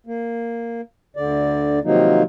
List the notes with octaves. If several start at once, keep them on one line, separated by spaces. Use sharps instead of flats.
A#3
D2 D3 D5
C3 D#3 F3 F#3 A#3 D#4